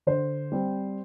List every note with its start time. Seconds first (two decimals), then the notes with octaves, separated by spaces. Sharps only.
0.07 D3 C5
0.52 G3 C4